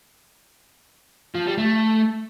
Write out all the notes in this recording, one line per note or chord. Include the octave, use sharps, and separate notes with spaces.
F3
G3
A3